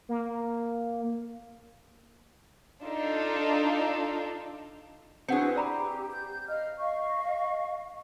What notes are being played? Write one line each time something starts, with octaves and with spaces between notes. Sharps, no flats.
A#3
D4 D#4 F4 A4
C4 D4 E4 F#4 G#4 B4 F#5 C#7
G4 D5 A#5 B5
G6
D#5 F5 F6
D#5 F5 C#6